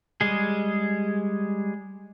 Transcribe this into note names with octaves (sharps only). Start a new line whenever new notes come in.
G3 G#3 G#4